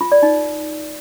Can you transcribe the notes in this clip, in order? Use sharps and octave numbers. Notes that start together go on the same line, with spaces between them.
F4
D5
D#4